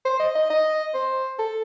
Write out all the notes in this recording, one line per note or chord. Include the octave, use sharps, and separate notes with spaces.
C5
D#5
D#5
D#5
C5
A4